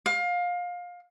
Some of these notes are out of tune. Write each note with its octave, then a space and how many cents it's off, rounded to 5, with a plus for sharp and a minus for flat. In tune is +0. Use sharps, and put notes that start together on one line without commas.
F5 +25